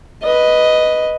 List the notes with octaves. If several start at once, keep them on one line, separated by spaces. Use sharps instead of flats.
B4 D#5